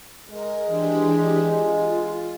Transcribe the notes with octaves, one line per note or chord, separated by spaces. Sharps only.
G#3 A#4
E3 D4 G4
F4